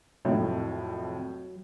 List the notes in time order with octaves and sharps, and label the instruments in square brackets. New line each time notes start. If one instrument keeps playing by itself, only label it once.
[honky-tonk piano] C2 F2 [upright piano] A2 [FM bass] F#3